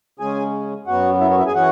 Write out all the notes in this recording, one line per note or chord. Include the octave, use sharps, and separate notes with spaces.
C#3 G#3 C#4 G#4 G#5
F#2 F#3 B3 F#4 F#5
E4 E5
C#4 C#5
E4 E5
G#4 G#5
E3 C#4 F#4 F#5